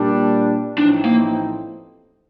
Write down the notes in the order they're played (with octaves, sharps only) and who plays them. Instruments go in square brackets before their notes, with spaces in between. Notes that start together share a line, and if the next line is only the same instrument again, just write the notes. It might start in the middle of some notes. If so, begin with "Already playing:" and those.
Already playing: [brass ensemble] A#2 G3 D4
[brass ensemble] A1 A2 F3 C4 D#4 [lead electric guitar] D4
[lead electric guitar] A#3